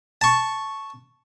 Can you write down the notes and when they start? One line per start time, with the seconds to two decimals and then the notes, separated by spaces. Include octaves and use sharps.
0.21 A5 C#6